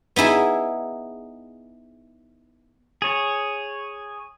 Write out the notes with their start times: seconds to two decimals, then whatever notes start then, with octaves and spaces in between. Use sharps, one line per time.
0.16 B3 D#4 E4 G#4
3.02 G#4 C#5